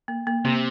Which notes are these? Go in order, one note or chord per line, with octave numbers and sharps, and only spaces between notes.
A#3
A#3
C3 A#3